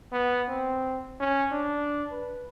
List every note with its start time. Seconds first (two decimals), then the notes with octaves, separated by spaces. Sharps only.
0.12 B3
0.49 C4
1.20 C#4
1.52 D4
2.11 B4